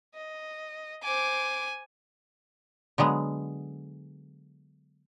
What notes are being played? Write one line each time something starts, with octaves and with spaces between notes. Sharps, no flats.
D#5
C5 G#5 D6
D3 F#3 G#3 B3